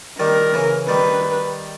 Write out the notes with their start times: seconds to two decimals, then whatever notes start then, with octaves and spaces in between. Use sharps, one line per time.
0.20 D#3 G3 A#4
0.54 C#3 E3
0.89 D#3 G3 B4